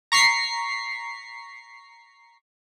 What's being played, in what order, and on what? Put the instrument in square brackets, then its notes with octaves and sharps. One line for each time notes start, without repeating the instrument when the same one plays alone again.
[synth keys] A#5 C#6 B6 C7